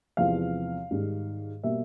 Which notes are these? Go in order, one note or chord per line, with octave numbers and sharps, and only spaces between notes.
E2 C3 F3 G#3 F5
G#2 D#3 G3
B2 G3 A#3 E5